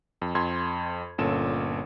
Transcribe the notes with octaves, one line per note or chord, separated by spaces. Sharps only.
F2
F2 C6 G#6
G1 A#2 C#4 A4 E7